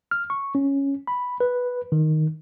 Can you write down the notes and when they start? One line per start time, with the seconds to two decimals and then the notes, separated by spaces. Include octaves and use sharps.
0.11 F6
0.30 C#6
0.55 C#4
1.07 B5
1.40 B4
1.92 D#3